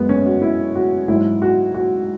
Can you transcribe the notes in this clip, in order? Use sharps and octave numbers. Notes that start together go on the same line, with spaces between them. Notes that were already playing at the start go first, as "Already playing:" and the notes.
Already playing: F#2 F#3 G#3 B3
C#4
F#4
E4
F#4
G#2 F#3 E4
F#4
F#4